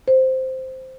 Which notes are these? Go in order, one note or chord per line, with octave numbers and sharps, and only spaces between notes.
C5